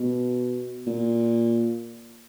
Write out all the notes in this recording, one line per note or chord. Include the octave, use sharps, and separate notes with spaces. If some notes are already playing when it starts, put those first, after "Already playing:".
Already playing: B2
A#2